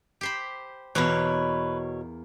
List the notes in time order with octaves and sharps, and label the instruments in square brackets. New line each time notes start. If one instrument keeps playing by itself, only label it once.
[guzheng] G4 C5 B5
[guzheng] E2 A#3 [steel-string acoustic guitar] B2 C#5 [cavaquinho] B4